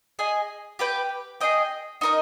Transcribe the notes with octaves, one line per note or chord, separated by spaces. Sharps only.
G#4 D#5 G#5
G4 B4 G5
G#4 D#5 G5
D#4 A#4 D#5